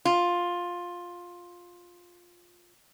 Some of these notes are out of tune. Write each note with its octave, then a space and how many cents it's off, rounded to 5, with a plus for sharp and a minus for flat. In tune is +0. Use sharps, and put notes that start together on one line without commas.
F4 +10